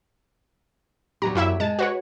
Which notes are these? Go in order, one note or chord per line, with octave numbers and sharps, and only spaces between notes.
E2 F#3 G4 A#5
F#2 E4 E5
G#3 A5
F#4 B4 C#5